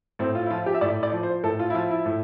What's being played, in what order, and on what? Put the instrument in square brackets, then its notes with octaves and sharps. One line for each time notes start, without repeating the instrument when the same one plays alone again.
[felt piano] A2 C4
F4
E4
F3 F4
G4
E5
A2 D5
D5
F3
C5
A2 A4
F4
E4
F3 F4
E4
A2